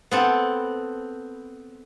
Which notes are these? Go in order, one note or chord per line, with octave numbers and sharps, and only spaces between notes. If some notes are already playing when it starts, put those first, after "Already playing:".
B3 C4 A4